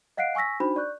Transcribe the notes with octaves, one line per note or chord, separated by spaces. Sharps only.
D#5 F5 F#5 F#6 C7 D7
G#5 C#6 E6 A#6 B6
D4 D#4 F#4 C5 B5
D5 C#6 F#6 G6